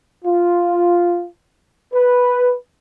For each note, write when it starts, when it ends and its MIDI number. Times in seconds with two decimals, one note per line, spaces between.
0.25 1.25 65
1.92 2.53 71